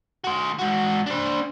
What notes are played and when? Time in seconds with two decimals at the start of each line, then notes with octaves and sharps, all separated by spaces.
0.24 F#4 C5
0.59 G#2 F#4
1.06 D4 C5